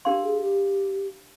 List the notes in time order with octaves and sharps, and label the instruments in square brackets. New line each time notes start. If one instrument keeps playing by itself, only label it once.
[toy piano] D4 G4 A#4 F5 C6
[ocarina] G#4
G4